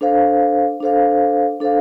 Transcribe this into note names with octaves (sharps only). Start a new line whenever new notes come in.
D4 A4 C5 F5
D4 A4 C5 F5
D4 A4 C5 F5